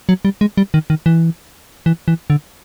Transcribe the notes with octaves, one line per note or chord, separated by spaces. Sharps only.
F#3
G3
G#3
G3
D#3
D#3
E3
E3
E3
D3